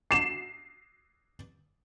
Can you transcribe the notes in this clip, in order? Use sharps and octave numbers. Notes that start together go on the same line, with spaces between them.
C7 E7